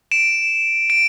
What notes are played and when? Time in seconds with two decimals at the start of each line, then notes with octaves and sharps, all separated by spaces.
0.12 D7 E7
0.90 D7